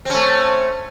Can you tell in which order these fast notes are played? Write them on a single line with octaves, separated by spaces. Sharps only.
C4 C#4 A3